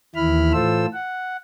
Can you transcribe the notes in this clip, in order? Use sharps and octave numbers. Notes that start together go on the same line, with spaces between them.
D#2 E3 E4 B5 F6
A2 E3 F4 A4 C5 E6
F#5